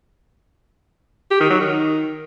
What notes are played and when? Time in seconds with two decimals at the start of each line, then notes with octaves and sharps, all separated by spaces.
1.31 G4
1.41 D#3
1.50 F#3
1.60 D#3